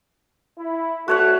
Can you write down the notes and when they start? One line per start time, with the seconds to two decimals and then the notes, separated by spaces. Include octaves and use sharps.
0.58 E4
1.08 C2 A3 F#4 C#5 F#5